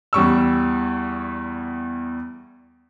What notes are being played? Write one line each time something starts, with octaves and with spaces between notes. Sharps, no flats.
E2 G3 C#6 E6